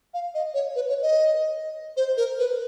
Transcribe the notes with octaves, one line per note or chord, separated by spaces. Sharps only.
F5
D#5
C#5
B4
C#5
D#5
C5
A#4
B4